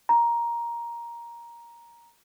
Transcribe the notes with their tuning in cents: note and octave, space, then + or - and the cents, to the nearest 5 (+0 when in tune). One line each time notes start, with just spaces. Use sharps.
A#5 +10